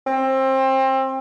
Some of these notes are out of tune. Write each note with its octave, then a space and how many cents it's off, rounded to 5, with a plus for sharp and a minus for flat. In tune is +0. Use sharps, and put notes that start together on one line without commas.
C4 +25